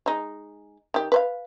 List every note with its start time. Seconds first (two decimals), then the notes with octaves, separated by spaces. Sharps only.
0.06 G#3 D#4
0.94 D#3 G4
1.12 B4 C5 F5